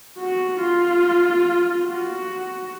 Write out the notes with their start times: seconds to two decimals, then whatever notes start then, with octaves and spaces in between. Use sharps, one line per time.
0.18 F#4
0.60 F4
1.87 F#4